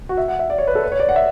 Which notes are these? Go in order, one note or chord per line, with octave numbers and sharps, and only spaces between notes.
F#4
E5
F#5
E5
D5
C#5
B4
A4
B4
C#5
D5
F#5
E5